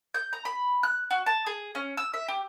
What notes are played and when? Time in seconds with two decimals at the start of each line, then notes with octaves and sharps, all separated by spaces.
0.14 G6
0.33 A#5
0.45 B5
0.83 F#6
1.11 F#4
1.26 A5
1.46 G#4
1.75 C#4
1.97 E6
2.14 E5
2.28 G4